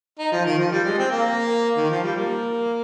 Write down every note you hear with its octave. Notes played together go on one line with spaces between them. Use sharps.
D#4
F3
D#3
F3
G3
G#3
C4
A#3
D#3
F3
G3
A#3